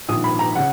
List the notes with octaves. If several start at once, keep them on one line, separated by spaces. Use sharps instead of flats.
A#1 G#2 D#3 D#6
B5
A#5
C#3 F#5